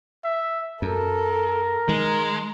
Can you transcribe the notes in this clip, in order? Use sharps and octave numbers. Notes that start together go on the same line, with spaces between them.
E5
F#2 A4 A#4
D#3 G#3 A#5